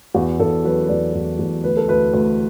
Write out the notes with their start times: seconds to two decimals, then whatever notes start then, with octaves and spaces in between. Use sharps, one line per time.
0.14 E2 F#4
0.39 E2 A4
0.65 F#3 B4
0.83 B4
0.89 E2 D5
1.14 E2
1.39 E2
1.63 D2 B4
1.77 A4
1.88 D2 B4
2.13 D2